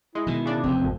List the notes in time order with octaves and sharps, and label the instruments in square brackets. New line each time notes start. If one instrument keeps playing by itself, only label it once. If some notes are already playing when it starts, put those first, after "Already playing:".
[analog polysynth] G#3 [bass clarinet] E4
[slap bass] B2 D#3
[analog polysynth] C#3 D4
[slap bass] F1 E2 [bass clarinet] C4
[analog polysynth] G#1 F2